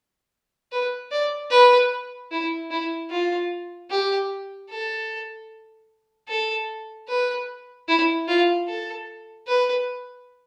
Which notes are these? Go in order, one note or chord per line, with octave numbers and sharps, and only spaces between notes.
B4
D5
B4
E4
E4
F4
G4
A4
A4
B4
E4
F4
A4
B4